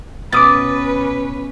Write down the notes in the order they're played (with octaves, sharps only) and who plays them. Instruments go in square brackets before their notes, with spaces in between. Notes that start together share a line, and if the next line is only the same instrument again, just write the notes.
[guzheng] B2 [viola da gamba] C#4 B4 [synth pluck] D6 D#6 A6